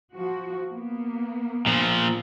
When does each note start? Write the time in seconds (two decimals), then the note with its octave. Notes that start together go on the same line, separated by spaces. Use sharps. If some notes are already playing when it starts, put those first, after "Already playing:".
0.16 F3 F#4
0.71 A#3 B3
1.66 A#2 F3